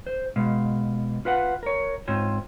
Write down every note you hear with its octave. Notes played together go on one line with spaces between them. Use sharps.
C5
B2 G#3 F5
F4 B4 F5 F#5
A#4 C#5
G#2 C4 F4 C5 C#5